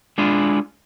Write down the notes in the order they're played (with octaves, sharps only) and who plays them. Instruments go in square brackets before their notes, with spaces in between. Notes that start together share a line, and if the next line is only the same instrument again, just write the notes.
[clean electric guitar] G#3 D4 E4 F4 G#4